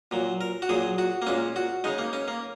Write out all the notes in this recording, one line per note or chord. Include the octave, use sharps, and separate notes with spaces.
A#2 F#3
A#4
F#4
A#2 F#3 G#4
F#4
A#3
A#2 G#3 C#4
F#4
C#3 G#3 D#4
A#3
C#4
A#3